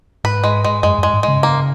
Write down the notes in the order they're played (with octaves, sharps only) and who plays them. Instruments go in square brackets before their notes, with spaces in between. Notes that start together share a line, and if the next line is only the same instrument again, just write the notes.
[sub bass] G#2 [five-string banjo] B4
[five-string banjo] G#3
G#3
[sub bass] F#2 [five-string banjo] G#3
[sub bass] F#2 [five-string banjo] G#3
[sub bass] G#2
[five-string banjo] G#3
[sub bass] C#3
[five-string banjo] A#3